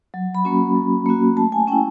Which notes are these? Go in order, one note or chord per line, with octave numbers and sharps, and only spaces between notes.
F#3
B5
A#3 C#4 F#4
F#3
A#3 C#4 F#4
A3 A5
G#5
C#4 E4 G5